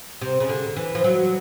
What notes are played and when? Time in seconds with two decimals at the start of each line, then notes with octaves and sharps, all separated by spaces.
0.21 C3
0.40 C#3
0.49 D3
0.76 E3
0.95 F3
1.04 F#3